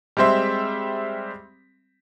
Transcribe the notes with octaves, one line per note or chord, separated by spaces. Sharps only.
G3 G#3 C4 C5 E5